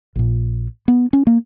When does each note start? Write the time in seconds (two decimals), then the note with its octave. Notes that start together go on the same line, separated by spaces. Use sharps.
0.16 A#1 A#2
0.88 B3
1.13 C#4
1.27 A#3